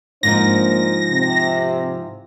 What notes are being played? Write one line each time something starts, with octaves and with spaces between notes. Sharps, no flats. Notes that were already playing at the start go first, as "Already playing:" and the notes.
G#2 F3 A#3 D4 D#4 C5 A#6
C3